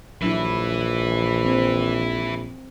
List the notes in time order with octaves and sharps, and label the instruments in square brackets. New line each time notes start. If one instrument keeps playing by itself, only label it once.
[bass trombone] A#1 [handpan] F#3 D4 E4 [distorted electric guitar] B4 E5
[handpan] C4